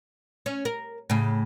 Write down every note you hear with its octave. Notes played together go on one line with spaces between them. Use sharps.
C#4
A#4
A2 C#3